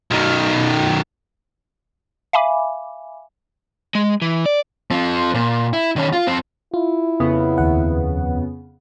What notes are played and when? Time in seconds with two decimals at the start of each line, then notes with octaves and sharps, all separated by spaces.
0.11 B1 D#3
2.33 E5 F5 G#5 B5 D6
3.95 G#3
4.22 E3
4.46 D5
4.91 F3 C4
5.34 A#2
5.73 E4
5.96 D#3 C#4
6.13 F4
6.27 F2 C4
6.74 E4 F4
7.20 F2 C#3 B3
7.58 D#2 F#5